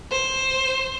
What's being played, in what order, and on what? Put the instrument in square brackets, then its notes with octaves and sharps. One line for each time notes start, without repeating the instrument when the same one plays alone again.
[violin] C5